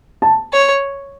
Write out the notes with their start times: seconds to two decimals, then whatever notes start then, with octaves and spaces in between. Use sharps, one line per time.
0.22 A5
0.53 C#5